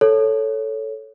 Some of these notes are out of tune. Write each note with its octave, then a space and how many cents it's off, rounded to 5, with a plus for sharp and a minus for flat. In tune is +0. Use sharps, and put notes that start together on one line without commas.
A4 +0 C#5 +0